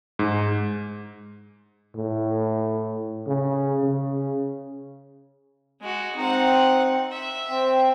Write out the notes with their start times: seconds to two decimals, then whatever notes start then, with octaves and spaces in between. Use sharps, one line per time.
0.19 G#2
1.96 A2
3.27 C#3
3.83 C#3
5.81 G#3 F#4
6.17 C4 D#4 F#5
7.12 E5
7.48 C4